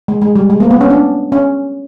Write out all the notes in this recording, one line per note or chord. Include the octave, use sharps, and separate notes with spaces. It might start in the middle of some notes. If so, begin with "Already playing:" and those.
G#3
G#3
G3
G#3
A#3
B3
C#4
D4
C#4